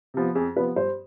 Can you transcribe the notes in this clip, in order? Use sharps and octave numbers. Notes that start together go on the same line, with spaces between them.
C3 F3 B3
F2 G#4
C3 F3 B3 B4
G2 C5